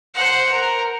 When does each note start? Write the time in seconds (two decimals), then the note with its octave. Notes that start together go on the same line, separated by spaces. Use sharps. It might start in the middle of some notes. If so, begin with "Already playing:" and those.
0.14 C5 F#5
0.52 A#4